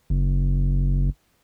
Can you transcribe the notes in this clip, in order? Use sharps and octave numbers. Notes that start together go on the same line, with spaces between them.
F#1